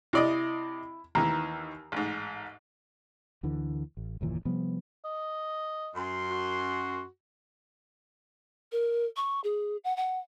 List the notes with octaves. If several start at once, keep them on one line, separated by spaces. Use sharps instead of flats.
C3 E4 D5 D#5
D#2 D#3 E3 A#5
A1 G#2
D2 D3 E3
A1
F#1 D#2 A#2 E3
C3 F3 G3 B3
D#5
F#2 C6
F#4
A#4
C#6
G#4
F#5
F#5